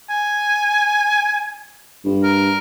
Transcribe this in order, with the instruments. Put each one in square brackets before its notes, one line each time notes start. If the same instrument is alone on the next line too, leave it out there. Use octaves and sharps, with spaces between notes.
[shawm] G#5
[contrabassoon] G2
[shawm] A#4